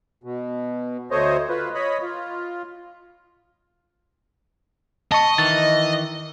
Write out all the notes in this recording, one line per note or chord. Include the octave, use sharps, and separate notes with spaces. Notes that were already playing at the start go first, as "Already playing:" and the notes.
B2
D2 A3 C5 C#5 D#5
F4 B4
C#5 D#5 B5
F4
D#5 A5 C#6
D#3 E3 A6